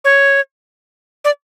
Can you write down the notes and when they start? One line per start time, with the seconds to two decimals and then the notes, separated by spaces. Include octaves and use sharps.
0.04 C#5
1.24 D5